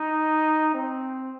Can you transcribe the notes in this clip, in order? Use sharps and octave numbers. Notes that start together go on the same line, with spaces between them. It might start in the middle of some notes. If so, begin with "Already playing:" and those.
Already playing: D#4
C4